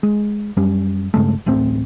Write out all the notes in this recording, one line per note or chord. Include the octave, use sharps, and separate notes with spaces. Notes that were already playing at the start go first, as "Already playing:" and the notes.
G#3
F#2 G3 C#4
G2 C#3 G#3 A3
D1 A1 A3 C4